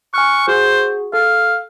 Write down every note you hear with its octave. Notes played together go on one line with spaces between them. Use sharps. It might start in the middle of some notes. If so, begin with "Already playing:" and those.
G#5 C#6 F6 F#6
F#4 G#4 C5
A4 F5